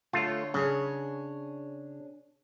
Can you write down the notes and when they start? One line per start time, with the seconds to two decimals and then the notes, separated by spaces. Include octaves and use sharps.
0.13 D3 A3 F4 C#5
0.54 C#3 D4 G#4 C#5